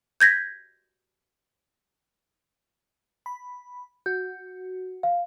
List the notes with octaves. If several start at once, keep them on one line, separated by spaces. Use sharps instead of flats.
G6 G#6 A#6 B6
B5
F#4 G6
F5